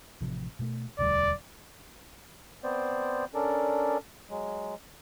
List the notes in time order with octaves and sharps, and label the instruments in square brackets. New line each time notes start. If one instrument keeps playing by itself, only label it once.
[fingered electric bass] A1 C3 F3
B2 A3
[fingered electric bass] E1 D2 G3 [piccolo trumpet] D5
[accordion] B3 C4 C5 D5
C#4 D4 A4 A#4 D5
F#3 G#3